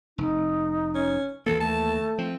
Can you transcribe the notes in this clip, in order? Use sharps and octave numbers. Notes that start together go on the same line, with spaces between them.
F1 D#4
C#4
D#2 E3 A#3 A4
A3 A5
F3 C4